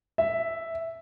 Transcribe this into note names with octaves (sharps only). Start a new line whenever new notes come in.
E5